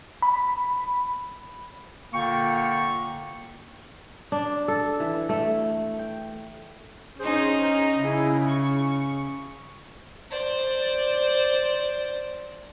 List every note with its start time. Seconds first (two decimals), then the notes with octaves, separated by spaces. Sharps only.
0.22 B5
2.13 A#2 D3 A#3 G5 C#6
4.32 D4
4.68 A4
5.00 E3
5.29 A3
5.99 G5
7.19 C#4 D#4 G#4 C5
7.63 A#5
8.00 C#3 E4 G#4
8.46 C#6
10.31 C5 D5